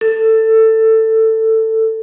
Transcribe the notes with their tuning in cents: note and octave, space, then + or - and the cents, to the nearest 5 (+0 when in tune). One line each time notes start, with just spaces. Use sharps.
A4 +15